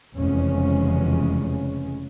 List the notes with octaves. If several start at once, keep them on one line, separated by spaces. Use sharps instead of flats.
F1 E2 C#3 G#3 C#4